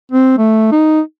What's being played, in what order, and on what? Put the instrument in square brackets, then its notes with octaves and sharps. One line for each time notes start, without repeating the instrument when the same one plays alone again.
[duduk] C4
A3
D#4